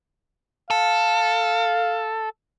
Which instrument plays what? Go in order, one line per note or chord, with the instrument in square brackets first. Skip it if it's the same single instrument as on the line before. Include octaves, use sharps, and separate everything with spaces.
[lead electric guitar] A4 [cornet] F5